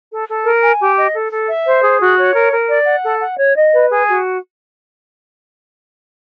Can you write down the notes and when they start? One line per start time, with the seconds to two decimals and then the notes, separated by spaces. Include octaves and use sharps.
0.11 A4
0.28 A4
0.45 A#4
0.63 G#5
0.79 G4
0.97 D#5
1.14 A4
1.31 A4
1.49 E5
1.66 C5
1.83 G#4
2.00 F#4
2.18 C#5
2.34 A#4
2.52 A#4
2.69 D5
2.86 F#5
3.04 A4
3.20 F#5
3.37 C#5
3.55 D#5
3.73 B4
3.90 G#4
4.07 F#4